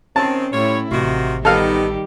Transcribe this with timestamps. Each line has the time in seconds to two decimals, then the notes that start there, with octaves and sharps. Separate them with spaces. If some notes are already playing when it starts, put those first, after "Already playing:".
0.16 D#3 C4 C#4 A5
0.52 A2 G3 E4 F4 C#5
0.91 A1 C3 D#3 F4 F#4
1.45 D#3 G3 B3 D#4 G4 A4 F5